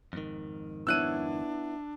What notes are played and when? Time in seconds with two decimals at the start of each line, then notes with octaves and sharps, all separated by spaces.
0.13 F2 G#2 D#3
0.87 B3 D4 E4 C#5 E6 F#6 D#7